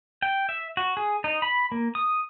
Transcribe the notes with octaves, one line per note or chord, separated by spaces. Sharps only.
G5
E5
F#4
G#4
D#4
B5
A#3
D#6